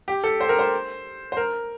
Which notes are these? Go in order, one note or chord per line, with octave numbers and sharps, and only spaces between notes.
G4
A4
C5
A#4
C5
C5
A#4